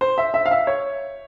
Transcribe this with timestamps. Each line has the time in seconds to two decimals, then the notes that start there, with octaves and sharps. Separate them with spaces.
0.01 C5
0.18 E5
0.34 E5
0.46 F5
0.51 E5
0.67 C#5